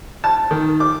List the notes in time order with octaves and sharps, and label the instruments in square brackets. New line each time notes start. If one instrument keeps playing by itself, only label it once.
[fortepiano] A5
D#3
D6